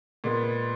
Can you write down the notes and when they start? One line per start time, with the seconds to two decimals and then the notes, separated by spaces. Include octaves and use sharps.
0.24 A#2 G#3 B3